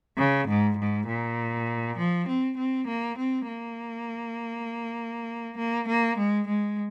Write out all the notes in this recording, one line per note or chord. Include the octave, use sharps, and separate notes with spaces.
C#3
G#2
G#2
A#2
F3
C4
C4
A#3
C4
A#3
A#3
A#3
G#3
G#3